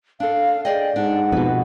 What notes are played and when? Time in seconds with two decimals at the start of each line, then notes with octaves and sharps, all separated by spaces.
0.20 D4 A4 F5
0.65 G#4 D5 D#5 G5
0.96 G#2 D4 F#5
1.32 F2 B2 B4